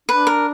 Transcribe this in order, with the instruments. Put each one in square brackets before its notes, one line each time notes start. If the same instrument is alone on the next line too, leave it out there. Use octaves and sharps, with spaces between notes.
[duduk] D4 [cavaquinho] B4
[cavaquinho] A#4